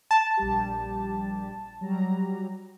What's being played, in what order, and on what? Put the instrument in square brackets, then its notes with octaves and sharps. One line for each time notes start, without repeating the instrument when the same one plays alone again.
[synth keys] A5
[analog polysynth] A#1 G3 G4
F#3 G3 A#5